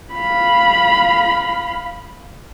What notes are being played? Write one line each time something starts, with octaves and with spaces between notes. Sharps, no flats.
F5 B5